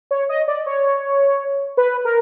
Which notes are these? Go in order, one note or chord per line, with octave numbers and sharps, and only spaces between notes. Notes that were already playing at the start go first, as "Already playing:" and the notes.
C#5
D#5
D5
C#5
B4
A#4